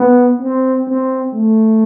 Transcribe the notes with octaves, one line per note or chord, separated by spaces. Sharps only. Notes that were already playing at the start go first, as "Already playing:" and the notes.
Already playing: B3
C4
C4
A3